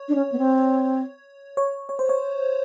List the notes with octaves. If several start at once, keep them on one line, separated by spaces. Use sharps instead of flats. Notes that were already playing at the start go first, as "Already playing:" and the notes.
Already playing: C#5
D4
C#4
B3
C4
C#5
C#5
C5
C#5